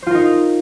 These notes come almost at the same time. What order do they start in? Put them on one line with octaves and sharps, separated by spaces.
C5 F4 A#4 D#4